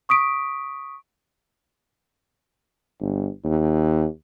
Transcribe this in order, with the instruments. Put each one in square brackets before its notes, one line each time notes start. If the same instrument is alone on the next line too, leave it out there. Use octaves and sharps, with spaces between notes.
[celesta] C#6 D#6 B6 D7
[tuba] G1
D#2